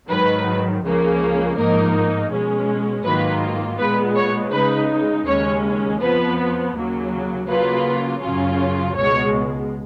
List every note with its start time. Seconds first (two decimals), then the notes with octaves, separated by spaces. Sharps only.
0.10 G#2 D#3 F#3 B4
0.84 C#2 C#3 F3 A#3 C#4
1.57 G#2 F3 A#3 D#4 A#4
2.31 B2 G#3 C#4
3.04 G#2 D#3 F#3 A#3 F4 B4
3.78 A#2 G#3 B3 B4
4.16 C#5
4.52 C#3 G#3 D#4 B4
5.26 D#2 C#3 G#3 C#4 C#5
6.01 F2 F3 B3 B4
6.74 D#2 C#3 F#3 A#3
7.48 C#3 F#3 A#3 F4 B4
8.22 F#2 C#3 F#3 C#4 F4
8.96 C#2 B2 G#3 C#5